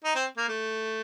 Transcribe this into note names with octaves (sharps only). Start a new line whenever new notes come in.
D#4
C4
A#3
A3